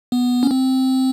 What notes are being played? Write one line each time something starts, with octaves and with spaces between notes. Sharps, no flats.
B3
C#4
C4